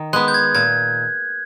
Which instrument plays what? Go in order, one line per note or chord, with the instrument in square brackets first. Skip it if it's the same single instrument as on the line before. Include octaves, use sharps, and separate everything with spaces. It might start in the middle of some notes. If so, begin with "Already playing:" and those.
Already playing: [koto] D#3
[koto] G#3 [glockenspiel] F#6
[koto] B3
[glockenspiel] G6
G#6
[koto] A#2 [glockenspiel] G#6